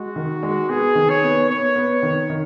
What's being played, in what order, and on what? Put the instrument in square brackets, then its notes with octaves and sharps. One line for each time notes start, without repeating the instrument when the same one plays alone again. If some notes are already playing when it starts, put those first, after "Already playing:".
Already playing: [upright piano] G#3 [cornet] F#4
[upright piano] D#3
G#3
[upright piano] B3 [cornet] G#4
[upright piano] D#3
[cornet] C#5
[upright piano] B3
[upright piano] B3 [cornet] C#5
[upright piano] B3
D#3
D#3